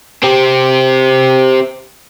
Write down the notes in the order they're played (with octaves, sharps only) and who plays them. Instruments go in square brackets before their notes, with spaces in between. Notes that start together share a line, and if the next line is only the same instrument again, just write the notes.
[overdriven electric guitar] C4 G4